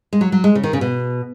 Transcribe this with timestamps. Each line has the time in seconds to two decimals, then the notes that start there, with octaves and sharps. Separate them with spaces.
0.13 G#3
0.21 F#3
0.32 F#3
0.44 G#3
0.55 C#3
0.64 D#3
0.73 C#3
0.81 B2